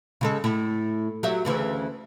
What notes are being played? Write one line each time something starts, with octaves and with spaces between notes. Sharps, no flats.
C#3 G#3 A4
A2
F#3 G4 E5
D2 C#3 E3